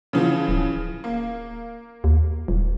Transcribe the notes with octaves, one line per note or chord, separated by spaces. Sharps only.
C#3 E3 F3
D1
A#3
D#2
D#1